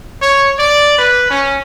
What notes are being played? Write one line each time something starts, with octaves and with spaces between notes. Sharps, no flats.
C#5
D5
B4
C#4